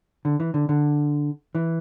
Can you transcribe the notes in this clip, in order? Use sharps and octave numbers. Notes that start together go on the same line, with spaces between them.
D3
E3
D3
D3
E3